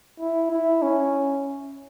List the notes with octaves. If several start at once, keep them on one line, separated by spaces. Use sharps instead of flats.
E4
E4
C#4